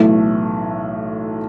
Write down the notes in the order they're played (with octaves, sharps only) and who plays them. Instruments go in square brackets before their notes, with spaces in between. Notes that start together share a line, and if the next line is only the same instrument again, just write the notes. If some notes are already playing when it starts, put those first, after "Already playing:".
Already playing: [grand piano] B1 A2 E3 [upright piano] A3